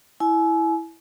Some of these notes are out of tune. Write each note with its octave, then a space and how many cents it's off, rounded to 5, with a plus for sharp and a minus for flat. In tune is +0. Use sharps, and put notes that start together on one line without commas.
E4 +0 G#5 +35